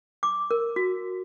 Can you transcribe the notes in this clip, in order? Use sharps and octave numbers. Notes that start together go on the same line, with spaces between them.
D6
A#4
F#4